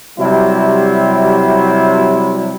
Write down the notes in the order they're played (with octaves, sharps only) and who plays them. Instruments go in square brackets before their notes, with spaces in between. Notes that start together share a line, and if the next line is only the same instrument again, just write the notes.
[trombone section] C3 F#3 G3 E4